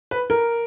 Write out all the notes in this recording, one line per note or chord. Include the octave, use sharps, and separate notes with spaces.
B4
A#4